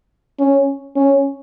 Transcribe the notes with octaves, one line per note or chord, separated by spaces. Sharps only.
C#4
C#4